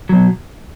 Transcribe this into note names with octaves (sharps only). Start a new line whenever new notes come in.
B2 F#3